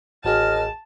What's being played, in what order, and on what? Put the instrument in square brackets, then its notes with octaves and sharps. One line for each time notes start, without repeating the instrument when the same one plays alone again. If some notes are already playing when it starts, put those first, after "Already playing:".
[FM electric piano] A1 F#4 G#4 [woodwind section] D#2 D#5 F6 [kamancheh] A5